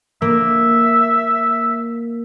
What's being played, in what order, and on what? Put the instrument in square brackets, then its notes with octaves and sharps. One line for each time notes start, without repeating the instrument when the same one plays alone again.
[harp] A#3 [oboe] E5